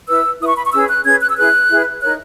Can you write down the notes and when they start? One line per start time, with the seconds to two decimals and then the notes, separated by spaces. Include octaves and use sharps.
0.08 E4 B4 E6
0.40 E4 B4 D#6
0.48 C#6
0.56 B5
0.65 C#6
0.72 C#4 G#4 B4 E6
0.89 F#6
1.04 C#4 G#4 B4 G#6
1.21 F#6
1.29 E6
1.37 E4 G#4 B4 F#6
1.69 E4 G#4 B4
2.01 D#4 A#4 C#5 F#6